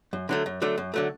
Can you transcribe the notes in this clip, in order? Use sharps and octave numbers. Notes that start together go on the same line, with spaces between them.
F#2
D3 F#3 A3
F#2
D3 F#3 A3
F#2
D3 F#3 A3